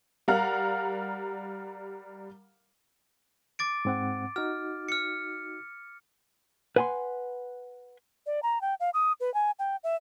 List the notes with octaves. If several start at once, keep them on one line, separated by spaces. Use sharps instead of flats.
G3 A#4 F5 F#5 A#5 F6
D6 A6 D7
G#2 C4 F#5
D#4 F#4 F6
F6 C#7
B4 F#5 G#5 A5 C6
D5
A#5
G5
F5
D#6
B4
G#5
G5
E5